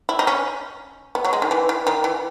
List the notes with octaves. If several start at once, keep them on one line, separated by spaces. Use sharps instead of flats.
E4
D#4
C#4
B3
F#3
G#3
D#3
E3
E3
D#3
E3